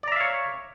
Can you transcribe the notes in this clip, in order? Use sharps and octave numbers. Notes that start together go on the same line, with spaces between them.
C#5 D5 E5 F5 A#5